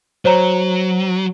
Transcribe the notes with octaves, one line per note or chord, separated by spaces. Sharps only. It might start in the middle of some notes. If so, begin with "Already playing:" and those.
F#3 C5 C#5 A#5